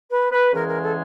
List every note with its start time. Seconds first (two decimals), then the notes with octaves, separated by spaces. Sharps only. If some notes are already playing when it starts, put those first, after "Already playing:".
0.09 B4
0.31 B4
0.53 E2 C#3 E3 G#3 A#4
0.67 A#4
0.81 A4